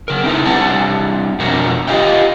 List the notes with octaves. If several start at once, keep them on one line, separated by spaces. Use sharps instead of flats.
C#3 A#4
C4 D#4 E4 G#4 A4 B4
G3 C4 D4 F#5 A5
F2 B2 C4 D4 F#4 A#4
F4 G4 D#5 F5 G5